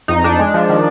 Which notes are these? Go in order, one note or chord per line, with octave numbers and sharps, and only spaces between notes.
F2 D#4
F2 D4
G#3
F3
D#3